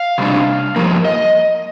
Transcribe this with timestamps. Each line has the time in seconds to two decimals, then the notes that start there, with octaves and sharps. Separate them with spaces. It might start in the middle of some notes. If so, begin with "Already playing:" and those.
Already playing: F5
0.18 C3 G3 D4
0.76 G2 F3 A#3
1.05 D#5